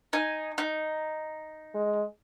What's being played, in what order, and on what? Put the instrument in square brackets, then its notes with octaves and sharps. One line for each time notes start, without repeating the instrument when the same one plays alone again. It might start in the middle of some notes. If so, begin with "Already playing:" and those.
[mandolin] D#4 G#5
D#4
[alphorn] G#3